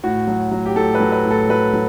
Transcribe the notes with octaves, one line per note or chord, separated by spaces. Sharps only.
A2 F#4
F#3
F#3
G4
A2 A4
B4
F#3
B4
A2
A4
F#3 B4
F#3